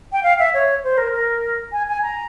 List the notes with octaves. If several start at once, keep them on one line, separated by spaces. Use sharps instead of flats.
G5
F5
E5
C#5
C5
A#4
A#4
G#5
G#5
A#5